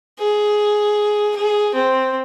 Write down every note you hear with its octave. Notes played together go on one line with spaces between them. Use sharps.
G#4
G#4
C4